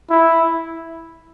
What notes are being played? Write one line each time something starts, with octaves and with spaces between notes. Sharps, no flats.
E4